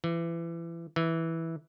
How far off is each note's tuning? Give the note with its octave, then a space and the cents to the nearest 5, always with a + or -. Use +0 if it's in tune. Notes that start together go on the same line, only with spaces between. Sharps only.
E3 +25
E3 -10